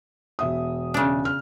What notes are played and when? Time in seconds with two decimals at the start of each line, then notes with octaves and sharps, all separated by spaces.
0.39 E1 E5 D#6
0.94 C#3 D4
1.25 F6